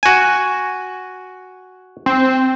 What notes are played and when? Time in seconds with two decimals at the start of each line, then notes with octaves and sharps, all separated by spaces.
0.03 F#4 G#5
2.06 C4